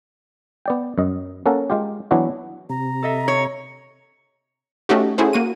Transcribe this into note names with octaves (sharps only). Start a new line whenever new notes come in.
B3 D5 G5
F#2 D#5
A#3 C#4 A4 A#4 F#5 A5
G#3 F4 G4
E3 F#3 B3 D4 E4 F#4
C3 A#5
A4 D#5 E5
C#5
A3 C#4 D#4 F#4 G4
C#4 E4 F#4 G#4 A4 C5
A#3 F#4 D#7